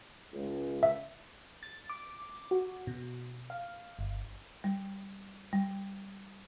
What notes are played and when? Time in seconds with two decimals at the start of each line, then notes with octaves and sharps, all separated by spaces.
0.33 C#2
0.83 E5
1.63 A6
1.90 D6
2.51 F#4
2.87 B2
3.50 F5
3.99 G1
4.64 G3
5.53 G3